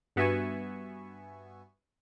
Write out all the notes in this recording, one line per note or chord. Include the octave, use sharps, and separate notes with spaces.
G2 B3 F#4 E5 G#5 C#6